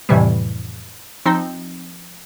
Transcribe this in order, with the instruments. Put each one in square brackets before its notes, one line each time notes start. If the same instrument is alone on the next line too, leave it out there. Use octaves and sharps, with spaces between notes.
[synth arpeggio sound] F2 A2 C3 E3 G3
F3 C4 D#4